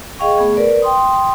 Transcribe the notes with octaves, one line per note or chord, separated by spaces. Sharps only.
G#4 D#5 F5 G5 C#6
A3 B3 G#4
A#4 B4 D5
G5 C6 D#6